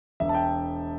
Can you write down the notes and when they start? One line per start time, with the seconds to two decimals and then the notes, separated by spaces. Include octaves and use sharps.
0.20 E1 E5
0.29 A5
0.34 G5